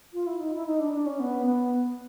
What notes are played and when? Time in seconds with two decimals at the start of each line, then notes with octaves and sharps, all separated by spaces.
0.13 F4
0.27 E4
0.40 D#4
0.54 E4
0.66 D#4
0.80 D4
0.93 D4
1.06 C#4
1.20 B3
1.46 B3